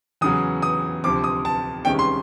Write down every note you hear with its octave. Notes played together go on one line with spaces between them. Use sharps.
E2 C#3 F#3 D#6
D#6
D2 C3 F3 D6
D#6
A5
C2 C3 D#3 G#3 C#4 G5
C6